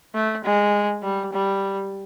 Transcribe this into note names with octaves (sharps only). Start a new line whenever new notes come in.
A3
G#3
G3
G3